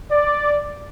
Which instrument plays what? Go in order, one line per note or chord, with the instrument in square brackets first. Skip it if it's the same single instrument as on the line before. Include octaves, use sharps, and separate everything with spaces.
[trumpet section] D5